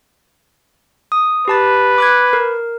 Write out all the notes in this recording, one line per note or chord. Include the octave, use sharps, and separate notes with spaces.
D#6
G4 B4 A5 A6
D6 F#6 G#6
A#4